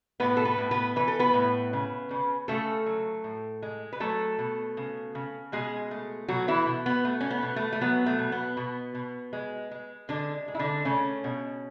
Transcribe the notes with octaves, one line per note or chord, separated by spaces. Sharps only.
A2 B3 B4
A4
B3 B4
A2
B3 B4
E3 B4
A4
B3 B4
A2
C#3
C#3
C#3 A3 A4
F#3
A2
G#3
B4
F#3 A3 A4
B2
C#3
C#3
B2 G#3 G#4
A3
B2 F#3 F#4
E3 E4
B2
B3
A3
C#4
B3
B2
A3
A3
F#3 B3
A3
B2
B3
B2
B2
G#3
G#3
D3 G#3 D4
G#3
E4
D3 D4
C#3 A3 C#4
B2